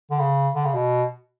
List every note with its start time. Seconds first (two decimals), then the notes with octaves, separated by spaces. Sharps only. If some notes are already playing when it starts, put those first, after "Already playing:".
0.11 D3
0.19 C#3
0.55 D3
0.65 C#3
0.74 B2